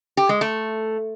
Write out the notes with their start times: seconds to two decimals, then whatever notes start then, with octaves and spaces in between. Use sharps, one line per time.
0.17 G4
0.29 G#3
0.41 A3